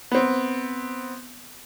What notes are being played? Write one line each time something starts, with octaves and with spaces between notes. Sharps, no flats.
B3 C4